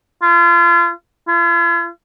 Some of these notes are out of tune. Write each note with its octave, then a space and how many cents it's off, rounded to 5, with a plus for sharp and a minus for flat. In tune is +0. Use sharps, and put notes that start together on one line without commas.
F4 -35
F4 -45